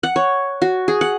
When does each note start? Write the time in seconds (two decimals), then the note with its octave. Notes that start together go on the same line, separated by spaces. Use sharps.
0.03 F#5
0.16 C#5
0.62 F#4
0.88 G#4
1.01 F#5